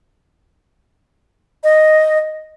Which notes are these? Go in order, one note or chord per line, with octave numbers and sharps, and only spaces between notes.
D#5